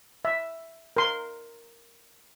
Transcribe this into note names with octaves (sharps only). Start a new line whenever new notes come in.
E5
A#4 C6